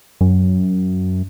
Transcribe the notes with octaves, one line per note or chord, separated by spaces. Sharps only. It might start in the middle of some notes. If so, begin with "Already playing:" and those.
F#2